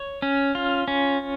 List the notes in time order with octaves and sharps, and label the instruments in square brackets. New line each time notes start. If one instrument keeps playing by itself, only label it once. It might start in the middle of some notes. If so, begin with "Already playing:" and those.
Already playing: [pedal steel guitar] C#5
C#4
F4
C#4